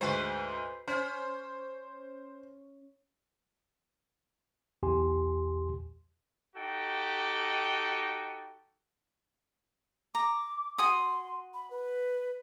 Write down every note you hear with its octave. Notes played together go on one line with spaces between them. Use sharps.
D2 G#2 B4 C5
C#4 C5
B1 E2 G4 G#5 C6
D#4 F#4 G4 A4 G5
A#5 D6
F#4 G#5 C6 D#6
B5
B4